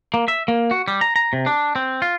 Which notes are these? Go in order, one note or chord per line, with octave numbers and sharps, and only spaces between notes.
A#3
E5
A#3
F#4
G3
A#5
A#5
C3
D4
C4
F4